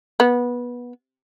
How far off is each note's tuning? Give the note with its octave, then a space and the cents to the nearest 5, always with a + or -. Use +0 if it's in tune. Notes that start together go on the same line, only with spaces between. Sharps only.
B3 -20